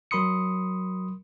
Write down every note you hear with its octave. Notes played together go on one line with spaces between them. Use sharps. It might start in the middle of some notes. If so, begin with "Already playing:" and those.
F#3 A#4 B5 C6 D#6 C#7